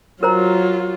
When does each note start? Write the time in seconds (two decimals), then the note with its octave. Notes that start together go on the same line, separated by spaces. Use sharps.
0.23 F#3 F4 A#4 C5 A#5